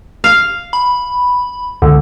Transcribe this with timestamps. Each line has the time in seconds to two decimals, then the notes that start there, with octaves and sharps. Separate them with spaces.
0.24 F5
0.73 B5
1.82 C#2 D3